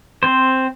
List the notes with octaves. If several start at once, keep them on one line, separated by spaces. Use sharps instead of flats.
C4 C5